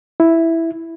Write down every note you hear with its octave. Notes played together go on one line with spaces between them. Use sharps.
E4